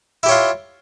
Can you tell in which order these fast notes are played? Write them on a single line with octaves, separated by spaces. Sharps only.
E4 G4 C#5 F4